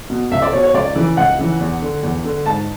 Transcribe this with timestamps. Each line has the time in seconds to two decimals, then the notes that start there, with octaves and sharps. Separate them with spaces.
0.10 B2
0.31 C#2 E5
0.42 D5
0.53 B2 C#5
0.63 C#5
0.74 C#2 D5
0.96 C#3 E3
1.17 C#2 F#5
1.39 C#3 E3
1.60 E2
1.82 D3
2.03 E2
2.24 D3
2.46 G#2 A5